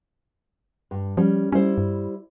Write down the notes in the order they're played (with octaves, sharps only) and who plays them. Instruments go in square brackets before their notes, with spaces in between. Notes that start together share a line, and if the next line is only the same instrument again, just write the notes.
[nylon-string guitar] G2
[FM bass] F3 [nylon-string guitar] G3 C#4
[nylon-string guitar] G3 E4 C5 [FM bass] C#4
[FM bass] G2